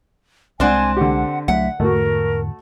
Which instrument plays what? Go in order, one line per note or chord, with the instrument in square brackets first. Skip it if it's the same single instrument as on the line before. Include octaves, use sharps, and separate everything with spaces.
[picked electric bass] C2 G#3 [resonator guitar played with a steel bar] C4 D4 C5 [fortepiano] D5 F#5 [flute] G#5
[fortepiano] D3 G4 [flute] F#5
[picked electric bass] C2 F#3 A3 [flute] E5 [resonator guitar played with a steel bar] F#5
[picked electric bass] E2 G#2 D3 [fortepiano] A3 F#4 [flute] A#4